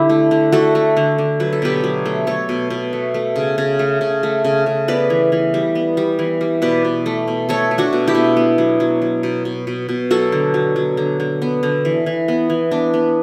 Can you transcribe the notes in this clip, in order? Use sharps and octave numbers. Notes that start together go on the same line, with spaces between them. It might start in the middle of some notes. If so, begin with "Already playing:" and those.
Already playing: D3 E4 G4
A3
D3
A3 F#4 A4
A3
D3
D3
F#3 B4
A4
B2 G4 B4
F#3
A3
A3 A4 C#5
B2
B2
A3
A3
C#3
C#3
A3
C#3
A3
C#3
C#3
B3 B4 D5
E3
E3
G3
B3
G3
E3
G3
B2 B4 D5
B2
A3
B2
A3 A4 C#5
A3
D4 F#4
B2
E4 G4
B2
B3
F#3
F#3
F#3
B2
B2
B2
B2
F#3 F#4 A4
D3
F#3
F#3
D3
D3
B3
D3
E3
E3
B3
E3
B3 D4
B3